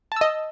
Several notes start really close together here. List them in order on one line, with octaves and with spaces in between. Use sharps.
A5 E6 D#5